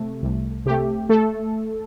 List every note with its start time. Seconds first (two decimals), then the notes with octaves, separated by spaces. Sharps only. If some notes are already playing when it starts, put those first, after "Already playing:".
Already playing: C3 A3
0.23 C2
0.66 C3 A3 G4
1.09 A3 A4